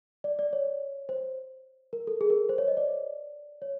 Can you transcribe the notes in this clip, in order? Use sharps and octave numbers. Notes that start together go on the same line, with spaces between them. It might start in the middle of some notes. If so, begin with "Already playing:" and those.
D5
D5
C#5
C5
A#4
A4
G#4
A#4
C5
C#5
D#5
D5
C#5